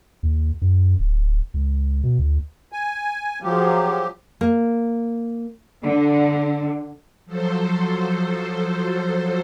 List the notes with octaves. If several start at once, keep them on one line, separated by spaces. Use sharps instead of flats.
D#2
F#2
D1
C#2
B2
D2
G#5
F3 F#3 G4 G#4
A#3
D3
F3 F#3 A4 C5